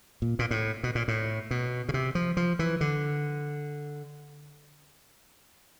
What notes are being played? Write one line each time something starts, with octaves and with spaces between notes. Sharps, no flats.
A#2
A#2
A2
B2
A#2
A2
B2
C#3
C3
F3
F3
E3
D3